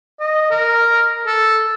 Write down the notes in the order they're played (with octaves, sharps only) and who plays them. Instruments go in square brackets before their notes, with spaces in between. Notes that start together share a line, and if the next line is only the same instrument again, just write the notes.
[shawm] D#5
A#4
A4